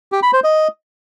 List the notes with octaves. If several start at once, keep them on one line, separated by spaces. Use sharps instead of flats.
G4
B5
C5
D#5